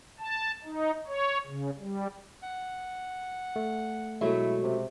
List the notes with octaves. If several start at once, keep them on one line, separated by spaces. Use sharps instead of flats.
A5
D#4
C#5
C#3
G3
F#5
A3
B2 F#3 G#3 A3 E4
C3